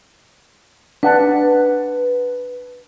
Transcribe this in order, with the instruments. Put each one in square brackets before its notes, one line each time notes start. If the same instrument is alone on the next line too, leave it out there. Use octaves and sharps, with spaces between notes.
[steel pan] D4 F#5 A5 [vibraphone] B4